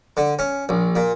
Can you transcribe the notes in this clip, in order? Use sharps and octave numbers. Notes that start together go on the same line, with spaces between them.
D3
C#4
A#1
A#2